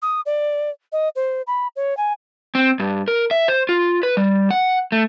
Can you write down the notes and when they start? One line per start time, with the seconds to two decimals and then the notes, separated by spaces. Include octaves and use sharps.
0.02 D#6
0.26 D5
0.92 D#5
1.16 C5
1.47 B5
1.76 C#5
1.97 G#5
2.55 C4
2.80 G2
3.08 A#4
3.31 E5
3.48 C5
3.69 F4
4.03 B4
4.17 G3
4.51 F#5
4.92 A3